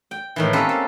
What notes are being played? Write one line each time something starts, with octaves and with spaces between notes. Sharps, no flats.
G5
A2 D#3 E3
A#3 C4 C#4 G4 A4 B4
A4